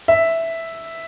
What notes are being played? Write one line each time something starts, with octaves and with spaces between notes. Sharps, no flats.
E5